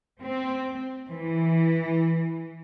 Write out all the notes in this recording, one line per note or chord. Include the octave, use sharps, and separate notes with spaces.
C4
E3